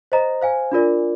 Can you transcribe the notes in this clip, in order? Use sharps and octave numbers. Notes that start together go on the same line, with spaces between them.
C5 D#5 A#5
C5 F5 G#5
D4 F4 A#4 D5